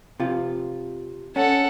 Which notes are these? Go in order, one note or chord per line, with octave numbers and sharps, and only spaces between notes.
C3 F4
C#4 A4 F#5